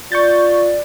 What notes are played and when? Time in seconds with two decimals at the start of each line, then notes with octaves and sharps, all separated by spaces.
0.12 F4 D5 C#6 G6 A6